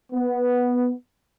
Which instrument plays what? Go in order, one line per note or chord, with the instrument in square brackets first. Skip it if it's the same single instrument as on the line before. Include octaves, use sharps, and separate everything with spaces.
[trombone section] B3